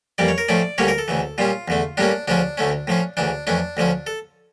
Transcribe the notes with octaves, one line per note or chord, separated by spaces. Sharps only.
F2 E3 G3 A#3 D5
C#5
A#4
A2 F3 A3 C#4 D5
D2 D3 G3 A#3 C#4 C#5
A#4
A4
D2 C#3 E3
A#2 G3 C#4 F4
E2 D3 A3
A2 G3 A#3 C#4 D4
D2 C#3 F3 C#4 D4
D2 D3 A3 C#4
A2 F3 C#4
D2 C#3 E3 D4
F2 E3 A3 C#4 D4
D2 D3 F3 C#4
A4